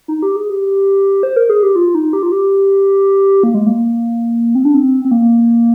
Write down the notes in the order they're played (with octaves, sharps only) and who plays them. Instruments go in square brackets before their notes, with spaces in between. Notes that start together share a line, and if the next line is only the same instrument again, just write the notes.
[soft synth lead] D#4
G4
G#4
G4
C5
A#4
G#4
G4
F4
D#4
G4
F4
G4
A#3
G#3
A#3
C4
D4
C4
C4
A#3